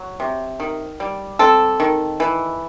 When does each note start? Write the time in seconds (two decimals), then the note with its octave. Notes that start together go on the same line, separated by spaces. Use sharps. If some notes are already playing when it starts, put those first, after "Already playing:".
Already playing: F#3
0.20 C3
0.60 D#3
1.00 G3
1.39 C4 A4
1.80 D#3
2.20 E3